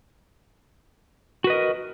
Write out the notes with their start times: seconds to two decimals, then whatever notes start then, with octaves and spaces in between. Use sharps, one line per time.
1.44 F#4
1.47 B4
1.50 D#5
1.53 A#4